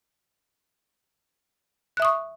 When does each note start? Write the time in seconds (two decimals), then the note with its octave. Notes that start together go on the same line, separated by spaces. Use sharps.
1.97 F#6
2.00 E5
2.02 D#6
2.05 C#6